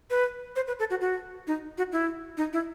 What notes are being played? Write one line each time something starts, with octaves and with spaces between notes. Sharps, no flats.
B4
C5
B4
A4
F#4
F#4
D#4
F#4
E4
D#4
E4